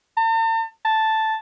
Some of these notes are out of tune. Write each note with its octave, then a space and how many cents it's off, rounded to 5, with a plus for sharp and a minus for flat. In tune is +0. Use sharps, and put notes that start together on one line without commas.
A5 +45
A5 +0